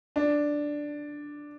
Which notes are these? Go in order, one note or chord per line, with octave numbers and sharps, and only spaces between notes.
D4